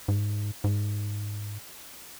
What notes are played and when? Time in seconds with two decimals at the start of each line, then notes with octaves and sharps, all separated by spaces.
0.08 G#2
0.64 G#2